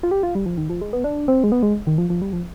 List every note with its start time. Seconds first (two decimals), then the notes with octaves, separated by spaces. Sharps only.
0.03 F4
0.11 G4
0.23 F4
0.35 G3
0.46 F3
0.57 D#3
0.70 F3
0.81 G#3
0.93 B3
1.04 D4
1.28 C4
1.44 G#3
1.52 B3
1.63 G#3
1.87 D#3
1.98 F3
2.10 F3
2.22 G3
2.33 F3